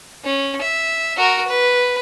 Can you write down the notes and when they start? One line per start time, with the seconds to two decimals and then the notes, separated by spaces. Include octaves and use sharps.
0.24 C#4
0.62 E5
1.17 F#4 A#4
1.48 B4